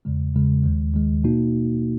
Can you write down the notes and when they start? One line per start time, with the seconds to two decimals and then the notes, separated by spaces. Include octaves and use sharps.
0.05 E2 C#3 G#3
0.35 E2 C#3 G#3
0.64 D#2 D#3 G#3
0.94 D#2 D#3 G#3
1.24 B2 A#3 D#4 F#4